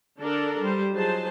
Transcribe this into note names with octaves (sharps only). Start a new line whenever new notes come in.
D3 D4 A4 A#4 D5
G3 C5
F3 F#3 D#4 G#4 C5 A5